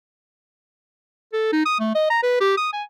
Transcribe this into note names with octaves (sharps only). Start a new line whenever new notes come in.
A4
D#4
D#6
A3
D#5
A#5
B4
G4
D#6
G#5